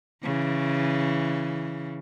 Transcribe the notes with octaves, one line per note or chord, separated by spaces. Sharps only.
C#3 E3